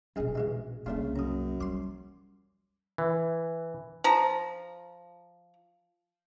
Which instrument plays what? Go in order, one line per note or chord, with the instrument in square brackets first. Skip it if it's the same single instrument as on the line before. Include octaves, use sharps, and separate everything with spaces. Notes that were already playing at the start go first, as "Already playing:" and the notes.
[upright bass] A#1 B2 [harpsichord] F#2 D#4 G#4
[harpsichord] E3 G#3 D#4
[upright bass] C2 A#3 [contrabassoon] C#3 [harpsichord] A3 D4 F4
[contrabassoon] F#2 [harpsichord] A#5 D#6
[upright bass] F3 G3 [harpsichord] C6 D6
[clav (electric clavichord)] E3
[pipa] F3 A#5